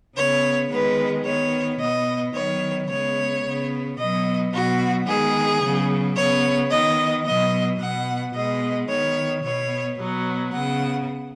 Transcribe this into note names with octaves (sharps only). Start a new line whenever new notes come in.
C#3 B3 C#5
D#3 G#3 B3 B4
D#3 B3 C#5
B2 B3 D#5
D#3 F#3 B3 C#5
C#3 G#3 B3 C#5
C#3 B3
B2 F#3 B3 D#5
B2 F#3 B3 F#4
D#3 G#3 B3 G#4
C#3 F#3 B3
C#3 B3 C#5
D#3 B3 D#5
B2 F#3 B3 D#5
B2 B3 F#5
B2 G#3 B3 D#5
D#3 B3 C#5
B2 B3 C#5
B2 F#3 B3
C#3 B3 F#5